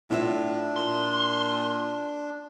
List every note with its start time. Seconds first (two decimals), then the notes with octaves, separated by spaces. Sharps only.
0.10 A2 D4 E4 F4 E5
0.76 A#2 C6